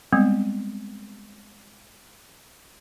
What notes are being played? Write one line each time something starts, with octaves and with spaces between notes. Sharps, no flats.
G3 G#3 B3 C4